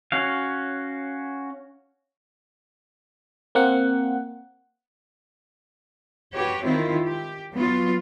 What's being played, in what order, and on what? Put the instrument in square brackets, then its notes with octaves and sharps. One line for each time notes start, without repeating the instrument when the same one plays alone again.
[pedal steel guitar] C#4 F#4 F5
[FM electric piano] A#3 C4 F#5
[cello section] F#4 G4 B4 C#5
D#3 C4 E4 F4
G4
F#3 B3 F4